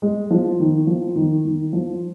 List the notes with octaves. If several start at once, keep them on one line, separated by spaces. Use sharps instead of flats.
G#3
F3
D#3
F3
D#3
D#3
F3